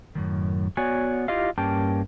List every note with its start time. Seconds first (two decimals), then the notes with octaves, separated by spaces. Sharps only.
0.15 F#2 A2 D#3
0.77 B3 F#4 C#5 D5 G#5
1.28 E4 F4 G4 D#5 F5
1.58 G2 A#3 C#4 G4 G5 A5